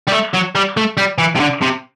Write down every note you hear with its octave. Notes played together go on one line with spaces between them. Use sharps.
G3
A3
F#3
G3
A3
G3
E3
C3
D3
C3